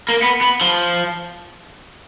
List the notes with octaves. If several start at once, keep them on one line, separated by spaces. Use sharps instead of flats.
A#3
B3
B3
F3